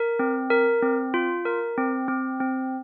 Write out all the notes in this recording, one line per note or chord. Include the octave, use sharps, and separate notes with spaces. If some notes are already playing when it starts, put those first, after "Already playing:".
Already playing: A#4
C4
A#4
C4
F4
A#4
C4
C4
C4